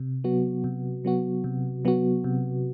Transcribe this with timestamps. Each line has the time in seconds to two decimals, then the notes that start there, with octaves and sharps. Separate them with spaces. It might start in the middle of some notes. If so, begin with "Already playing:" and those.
Already playing: C3
0.24 F#3 B3 F#4
0.64 C3
1.05 F#3 B3 F#4
1.44 C3
1.85 F#3 B3 F#4
2.24 C3